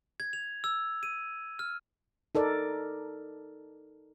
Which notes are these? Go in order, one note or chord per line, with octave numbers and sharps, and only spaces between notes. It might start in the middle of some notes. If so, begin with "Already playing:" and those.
G#6
F7
E6
D#7
F6
D#4 A4 A#4 D5